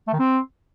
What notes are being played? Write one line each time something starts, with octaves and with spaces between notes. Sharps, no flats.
A3
D#3
C4